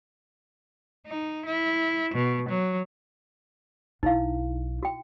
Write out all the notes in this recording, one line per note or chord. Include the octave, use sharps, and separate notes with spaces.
D#4
E4
B2
F#3
B1 D#4 E4 F5
F#4 G5